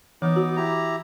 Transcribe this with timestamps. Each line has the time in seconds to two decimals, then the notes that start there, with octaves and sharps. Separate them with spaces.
0.22 E3 B3 D#4 D6
0.36 F#4
0.57 E4 G4 A#5